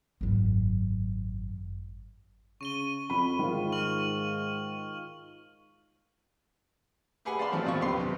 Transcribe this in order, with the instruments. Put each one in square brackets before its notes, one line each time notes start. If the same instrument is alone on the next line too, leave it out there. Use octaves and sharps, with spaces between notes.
[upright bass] G#1 F#2
[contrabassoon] C#3 [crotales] C#6 D#7 G7
[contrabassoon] F2 [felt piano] B5
[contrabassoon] G#2 [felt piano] D#3 F4
[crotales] C#6 F6 F#7
[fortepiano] G4 G#4 B4 F#5 G#5
D5 F5 A5 B5 C6
D#3 F3 A3 C4 F#4 C5
F2 A#2 F3 B3 F4 C#6
C#2 G4 B4 C6
B1 C3 D#3